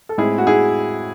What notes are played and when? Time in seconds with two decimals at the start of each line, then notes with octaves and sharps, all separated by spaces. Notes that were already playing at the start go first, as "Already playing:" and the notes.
0.09 A4
0.18 A2 G#3 C4 E4 G#4
0.38 F#4
0.47 E4 G#4